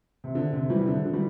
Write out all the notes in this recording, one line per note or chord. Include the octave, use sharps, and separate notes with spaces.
C3
D3
C3
E3 G3
C3
D3
D3
E3 G3